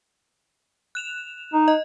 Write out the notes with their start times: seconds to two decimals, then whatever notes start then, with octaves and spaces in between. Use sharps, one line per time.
0.95 F#6 E7 F7
1.54 D#4
1.68 D#5